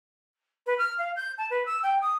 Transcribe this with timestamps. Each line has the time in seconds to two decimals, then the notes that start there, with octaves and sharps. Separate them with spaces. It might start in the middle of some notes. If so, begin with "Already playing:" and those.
0.66 B4
0.78 F6
0.98 F5
1.16 G6
1.38 A5
1.50 B4
1.66 E6
1.83 G5
2.01 D#6